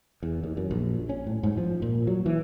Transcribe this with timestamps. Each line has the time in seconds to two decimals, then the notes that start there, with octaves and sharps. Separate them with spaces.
0.23 E2
0.44 D#2
0.57 F#2
0.71 A#1
1.09 C#4
1.27 A2
1.43 G#2
1.57 F3
1.82 A#2
2.07 F#3
2.26 E3